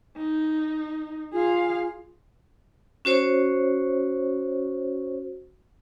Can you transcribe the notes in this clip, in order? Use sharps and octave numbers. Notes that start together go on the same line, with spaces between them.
D#4
F4 G#4 F5
C#4 F#4 C5 C#5